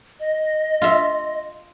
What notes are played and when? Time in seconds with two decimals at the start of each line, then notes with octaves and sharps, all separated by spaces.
0.20 D#5
0.82 F4 E5